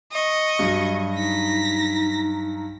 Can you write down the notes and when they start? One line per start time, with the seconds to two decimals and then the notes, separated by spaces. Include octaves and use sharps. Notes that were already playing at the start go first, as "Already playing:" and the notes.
0.12 D#5 C#6
0.59 G2 F#3
1.16 D#4 A#6 B6